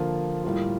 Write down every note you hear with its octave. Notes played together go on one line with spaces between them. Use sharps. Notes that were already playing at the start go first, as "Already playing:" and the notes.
Already playing: D3 F3 A#3 F4
A2 G3 A#3 F4